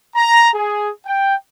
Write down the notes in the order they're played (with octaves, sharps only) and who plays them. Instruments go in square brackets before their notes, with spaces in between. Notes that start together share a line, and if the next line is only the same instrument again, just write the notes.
[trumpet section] A#5
G#4
G5